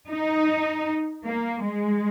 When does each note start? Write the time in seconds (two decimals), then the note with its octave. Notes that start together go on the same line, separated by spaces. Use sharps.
0.09 D#4
1.24 A#3
1.63 G#3